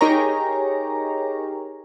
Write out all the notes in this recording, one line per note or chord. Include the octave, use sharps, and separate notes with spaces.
D#4 G4 G#4 A#4 C#5 A#5